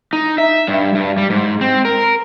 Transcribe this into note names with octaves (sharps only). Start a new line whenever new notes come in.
D#4
E5
G2
G2
G3
G#2
C4
A#4